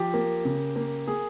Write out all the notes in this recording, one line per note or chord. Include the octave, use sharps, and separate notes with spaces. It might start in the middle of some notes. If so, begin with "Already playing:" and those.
Already playing: F3 G4
A#3
C#3
A#3
A#3 G#4